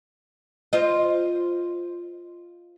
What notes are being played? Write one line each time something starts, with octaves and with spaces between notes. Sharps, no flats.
F4 C5 D#5